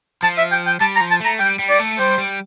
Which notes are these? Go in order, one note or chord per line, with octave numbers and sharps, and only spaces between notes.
F3 A5
E5
G5
G5
G3 A5
A#5
F3
A5
A3 A#5
G3 G5
G3
D5
A3
G3 C5
G3